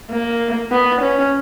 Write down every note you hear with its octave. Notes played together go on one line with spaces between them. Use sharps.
A#3
B3
C#4